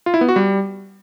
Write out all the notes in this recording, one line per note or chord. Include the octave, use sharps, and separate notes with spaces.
F4
E4
B3
F#4
G3